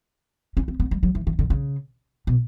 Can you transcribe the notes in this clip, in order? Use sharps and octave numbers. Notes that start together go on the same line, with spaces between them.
C#4
C4
B3
G3
F#3
E3
D#3
D3
C#3
B2